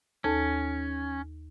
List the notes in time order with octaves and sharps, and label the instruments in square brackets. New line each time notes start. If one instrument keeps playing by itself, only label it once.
[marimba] D#2 A4 A5 [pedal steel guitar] C#4